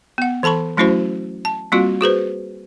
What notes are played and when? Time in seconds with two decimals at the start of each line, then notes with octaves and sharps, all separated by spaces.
0.18 B3 F#5
0.43 E3 A4 A5 B5 C#6
0.77 F#3 A3 C#4 E4 F#4 C5
1.45 A5
1.72 G3 A#3 C4 F4 F#4
2.01 F#4 G#4 B4 C5